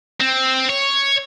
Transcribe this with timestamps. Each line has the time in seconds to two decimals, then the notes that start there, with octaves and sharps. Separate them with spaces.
0.20 C4
0.69 C#5